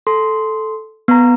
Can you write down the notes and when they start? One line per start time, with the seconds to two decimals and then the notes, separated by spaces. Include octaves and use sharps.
0.07 A4 C6
1.08 B3 A#5